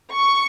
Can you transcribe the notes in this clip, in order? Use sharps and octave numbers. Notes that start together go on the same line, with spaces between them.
C#6